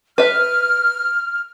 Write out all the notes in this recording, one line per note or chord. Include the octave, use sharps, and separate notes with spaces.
B4 E5 F6